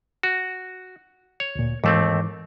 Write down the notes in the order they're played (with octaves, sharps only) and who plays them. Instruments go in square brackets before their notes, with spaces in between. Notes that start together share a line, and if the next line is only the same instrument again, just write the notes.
[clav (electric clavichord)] F#4
C#5
[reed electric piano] D2 A#2
[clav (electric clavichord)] D#2 A3 C4 [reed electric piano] G#2 E3 D6